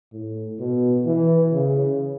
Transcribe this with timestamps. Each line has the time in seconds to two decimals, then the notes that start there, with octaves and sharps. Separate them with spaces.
0.12 A2
0.59 B2
1.06 E3
1.52 C#3